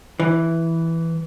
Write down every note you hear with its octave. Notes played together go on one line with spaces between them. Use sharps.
E3